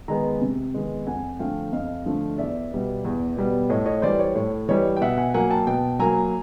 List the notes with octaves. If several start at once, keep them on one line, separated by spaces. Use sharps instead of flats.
D#3 G#3 B3 G#5 A#5
C3
D#3 G#3 B3
F2 F#5 G#5
D3 F3 A3 F5 G5
F2 D#5 F5
D3 F3 A3
E2 D5 E5
B2 G3 B3
E2
B2 G3 B3
A2 C#5 D#5
C#5 D#5
E3 G3 C5 D5
C#5
A2 C#5
E3 G3 C#5 D#5
G5
B2 E5 F#5
F#5 G#5
F#3 A#3 F#5 G#5
G5 A5
B2 G5 A5
F#3 A#3 G#5 A#5